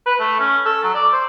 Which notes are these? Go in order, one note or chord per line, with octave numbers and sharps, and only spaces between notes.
B4
A3
C#4
A4
F#3
D5
C5